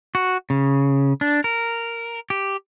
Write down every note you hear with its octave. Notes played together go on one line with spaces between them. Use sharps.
F#4
C#3
D4
A#4
G4